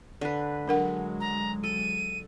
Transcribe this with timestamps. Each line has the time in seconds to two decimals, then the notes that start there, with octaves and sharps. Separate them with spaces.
0.21 D3 B4
0.68 F#3 G#3 D4 A#4 F#5
1.20 A#5
1.63 A4 D#7